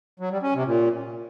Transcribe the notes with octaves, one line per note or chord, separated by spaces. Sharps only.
F#3
G3
C#4
C3
A#2